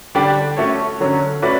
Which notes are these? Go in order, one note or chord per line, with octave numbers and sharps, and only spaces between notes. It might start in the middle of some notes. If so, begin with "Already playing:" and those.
D3 G3 D4 G4 D5
A3 C#4 F#4 A4 C#5
D3 F#3 C#4
A3 C#4 F#4 B4 D5